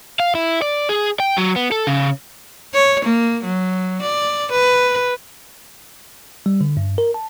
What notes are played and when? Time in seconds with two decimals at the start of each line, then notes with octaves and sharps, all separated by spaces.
0.20 F5
0.35 E4
0.62 D5
0.89 G#4
1.20 G5
1.37 F#3
1.56 B3
1.72 A4
1.87 C#3
2.74 C#5
3.05 A#3
3.44 F#3
4.02 D5
4.52 B4
6.46 G3
6.61 D3
6.77 G2
6.98 A#4
7.14 A5